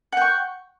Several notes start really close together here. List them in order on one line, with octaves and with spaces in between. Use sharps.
F#5 G5 C#6